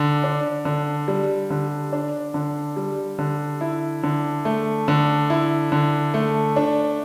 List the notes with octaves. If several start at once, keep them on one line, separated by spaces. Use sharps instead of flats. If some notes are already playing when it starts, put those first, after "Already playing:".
Already playing: D3
D4
D3
G3
D3
D4
D3
G3
D3
E4
D3
A3
D3
E4
D3
A3
D4